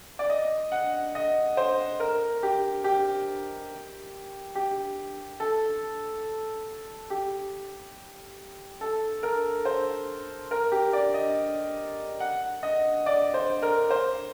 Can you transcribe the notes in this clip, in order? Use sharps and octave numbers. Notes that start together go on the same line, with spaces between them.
D5
D#5
F#5
D#5
C5
A#4
G4
G4
G4
A4
G4
A4
A#4
C5
A#4
G4
D5
D#5
F#5
D#5
D5
C5
A#4
C5